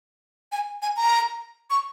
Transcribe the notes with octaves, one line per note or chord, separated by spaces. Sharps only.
G#5
G#5
A#5
C#6